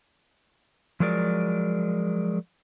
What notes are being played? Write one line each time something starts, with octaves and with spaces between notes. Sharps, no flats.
F3 F#3 G#3 A#4 D5